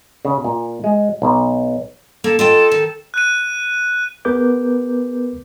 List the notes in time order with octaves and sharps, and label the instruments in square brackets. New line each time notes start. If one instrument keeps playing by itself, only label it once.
[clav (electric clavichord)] C#3
A#2
G#3
B1
[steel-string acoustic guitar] A#3 [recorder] A4
[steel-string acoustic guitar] F4 D#5 G5 [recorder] A4
[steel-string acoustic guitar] D#3
[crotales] F#6 D#7
[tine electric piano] B3 G#4 A#4 B4 D6 G6